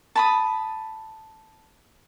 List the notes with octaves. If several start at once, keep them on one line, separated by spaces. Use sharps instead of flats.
A5 B5 D#6